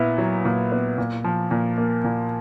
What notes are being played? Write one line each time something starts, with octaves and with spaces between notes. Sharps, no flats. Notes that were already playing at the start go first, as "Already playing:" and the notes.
Already playing: A#2 B3 E4
F#3
A#2
B3
A#2
F3
A#2
A#3
A#2